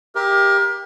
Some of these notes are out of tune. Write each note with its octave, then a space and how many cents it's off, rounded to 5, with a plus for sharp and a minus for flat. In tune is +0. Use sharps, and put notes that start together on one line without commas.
G4 +10 A#4 +30 E5 +0